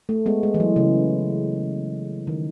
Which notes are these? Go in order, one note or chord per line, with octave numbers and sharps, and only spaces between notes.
A3
G#3 B3
G#3
E3
F#3
C#3
D#3